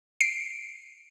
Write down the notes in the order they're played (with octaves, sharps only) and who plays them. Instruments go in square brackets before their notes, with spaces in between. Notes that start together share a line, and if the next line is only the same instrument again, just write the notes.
[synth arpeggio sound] C7 D7